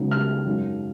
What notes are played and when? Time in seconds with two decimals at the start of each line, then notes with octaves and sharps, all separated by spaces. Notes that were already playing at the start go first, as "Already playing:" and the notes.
Already playing: C#2 C#3 F#3 B3 D#4
0.11 F6
0.46 G#1 F#2 D#3 A#3